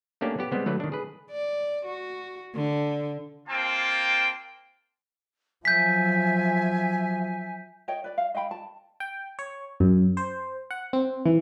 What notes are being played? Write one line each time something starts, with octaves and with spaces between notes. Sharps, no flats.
A3 A#3 C#4 D4 G4
B3 G4
G3 G#3 B3 C4
D3 F#3 A3 B4
D#3 D4
G#4 B4
D5
F#4
D3
A#3 C4 F4 G5 A5
F3 F#3 E5 G#5 G6 B6
C#5 D#5 G5
B4 D5
F5
D#5 F5 G5 B5
A5
G5
C#5
F#2
C5
F#5
C4
E3